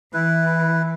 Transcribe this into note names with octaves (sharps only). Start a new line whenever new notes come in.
E3 E4 B4